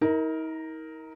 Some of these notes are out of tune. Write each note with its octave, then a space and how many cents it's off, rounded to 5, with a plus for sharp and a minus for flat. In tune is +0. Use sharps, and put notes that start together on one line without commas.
D#4 +45 A#4 +0